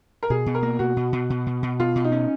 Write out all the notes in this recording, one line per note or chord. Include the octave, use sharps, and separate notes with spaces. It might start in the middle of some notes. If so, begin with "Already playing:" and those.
A#4
B2 G#4
B2
A#4
A#3
B2 F#4
B2
B2
B2
B2
B2
B2 F4
B2
D#4
C#4